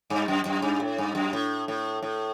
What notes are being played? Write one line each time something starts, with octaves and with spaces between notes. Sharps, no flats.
G2
F#2
F#2
G2
A2
G2
F#2
A2
A2
A2